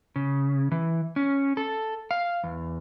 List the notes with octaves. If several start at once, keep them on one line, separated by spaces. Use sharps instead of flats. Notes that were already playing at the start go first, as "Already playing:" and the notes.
C#3
E3
C#4
A4
F5
E2